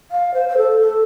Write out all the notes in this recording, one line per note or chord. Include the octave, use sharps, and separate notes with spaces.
F5
C5
C5
A4
A4